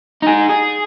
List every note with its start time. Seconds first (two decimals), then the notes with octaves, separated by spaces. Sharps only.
0.22 D#4 G#4
0.50 G#4